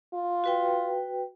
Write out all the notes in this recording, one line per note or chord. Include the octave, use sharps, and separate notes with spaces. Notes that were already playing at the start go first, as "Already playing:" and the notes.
F4
F#4 B4 G5